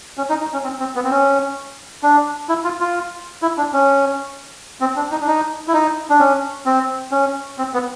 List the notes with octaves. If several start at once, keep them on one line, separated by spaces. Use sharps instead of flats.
C#4
D#4
D#4
C#4
C4
C4
B3
C4
C#4
D4
E4
F4
F4
E4
D4
C#4
C4
D4
D#4
D4
D#4
E4
D#4
D4
C#4
C4
C#4
C4
B3